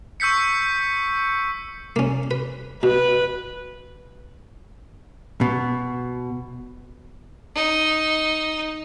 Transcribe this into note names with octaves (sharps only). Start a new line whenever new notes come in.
C#6 E6 G6 B6 C#7
A#3 C#4
B4
B2 B4
B2
D#4